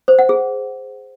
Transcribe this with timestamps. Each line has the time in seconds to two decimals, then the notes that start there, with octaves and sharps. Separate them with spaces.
0.08 C5
0.19 F#5
0.29 G#4